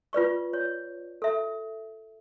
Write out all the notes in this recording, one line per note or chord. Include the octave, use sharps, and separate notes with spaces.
F4 B4 D5 C#6
C#5
A4 E5